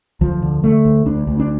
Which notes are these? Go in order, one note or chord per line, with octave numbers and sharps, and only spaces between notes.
D2 F3
D3
D3 A3
D2
D2 D4
D2
D4